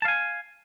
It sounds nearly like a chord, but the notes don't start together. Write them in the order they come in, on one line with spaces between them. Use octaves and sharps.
A5 F5 G#5